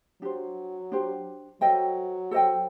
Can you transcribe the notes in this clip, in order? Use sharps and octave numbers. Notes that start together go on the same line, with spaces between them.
F#3 D4 G4 C5
D4 G4 C5
F#3 A4 C5 D#5 G5
A4 C5 D#5 G5